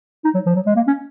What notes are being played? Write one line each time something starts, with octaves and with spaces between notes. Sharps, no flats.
D#4
F#3
F3
F#3
G#3
A#3
C#4